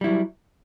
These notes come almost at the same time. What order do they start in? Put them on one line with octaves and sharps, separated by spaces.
G3 E4 F#3